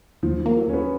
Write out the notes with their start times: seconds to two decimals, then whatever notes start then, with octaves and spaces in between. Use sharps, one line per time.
0.23 D#2 F3
0.40 F3
0.46 A#3
0.57 F#3
0.68 D#2 C#4
0.73 B3